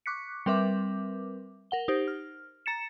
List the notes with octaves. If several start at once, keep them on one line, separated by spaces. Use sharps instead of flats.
C#6 D6 F#6 B6 C#7
G3 C4 A#4 B4 E5 D6
A#4 F#5 G7
D#4 G4 C5
F6
A#5 A6 C#7 E7